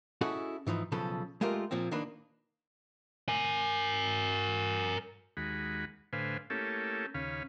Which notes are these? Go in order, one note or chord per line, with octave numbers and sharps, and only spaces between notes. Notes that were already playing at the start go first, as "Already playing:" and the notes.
C#4 E4 F#4 G#4 A4 D#5
G#2 E3 F3 D#4
B1 C#3 F3 A4 B4
G#3 A3 F4 G4 A#4
A#2 F3 A#3 C4
D#3 A#3 D4 B4
A#4 G#5
D#2 G#3 F#4 B5
A2 D3 B4 C5 F5 G#5
A3 A#3 C#4 E4 G4 A4
D#2 C#3 C#4 F5 B5